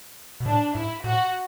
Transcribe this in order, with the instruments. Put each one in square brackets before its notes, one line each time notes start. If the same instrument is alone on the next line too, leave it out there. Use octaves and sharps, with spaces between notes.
[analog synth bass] B2
[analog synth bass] A2 [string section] D4
[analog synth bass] G#2 [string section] E4
[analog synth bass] A2 [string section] F#4